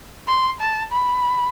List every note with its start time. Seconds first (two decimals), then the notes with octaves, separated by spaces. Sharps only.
0.28 C6
0.61 A5
0.92 B5